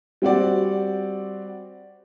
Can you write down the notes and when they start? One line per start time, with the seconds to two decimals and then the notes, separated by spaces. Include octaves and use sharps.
0.22 G3 C4 F#4 D5